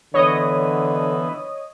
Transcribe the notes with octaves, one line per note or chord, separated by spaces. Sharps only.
D3 E3 B3 C#5 D#5 D#6